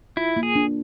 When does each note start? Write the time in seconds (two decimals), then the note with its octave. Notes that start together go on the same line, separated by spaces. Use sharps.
0.17 E4 F4
0.36 A#3
0.43 G#4
0.56 D4